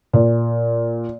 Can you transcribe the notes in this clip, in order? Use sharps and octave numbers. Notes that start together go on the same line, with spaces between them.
A#2